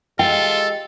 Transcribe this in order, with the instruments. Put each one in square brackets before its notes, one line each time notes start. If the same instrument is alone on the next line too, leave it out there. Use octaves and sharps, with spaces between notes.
[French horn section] G#3 G4 D#5 [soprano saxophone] F4 [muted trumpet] A4 [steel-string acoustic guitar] G5